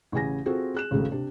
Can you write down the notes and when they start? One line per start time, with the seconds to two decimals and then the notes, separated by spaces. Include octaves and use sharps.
0.12 A1 C#3 G#5 A#6
0.46 C4 F4 F#4 G#4 A4
0.74 G#4 F#6 E7
0.91 G#1 C#2 C#3 A3 F#4
1.12 C3 D4